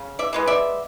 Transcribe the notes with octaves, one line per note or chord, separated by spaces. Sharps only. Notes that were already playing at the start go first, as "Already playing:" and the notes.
Already playing: C#3
D5 E5
E3 G#3 B3
D5 E5